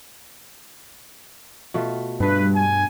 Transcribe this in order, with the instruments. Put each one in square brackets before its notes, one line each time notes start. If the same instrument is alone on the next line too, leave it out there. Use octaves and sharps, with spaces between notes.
[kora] B2 A3 F4
[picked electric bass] G2 D4 [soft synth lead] G3 [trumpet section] B4
[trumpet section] G#5